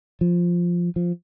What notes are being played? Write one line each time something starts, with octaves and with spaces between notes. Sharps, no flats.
F3
F3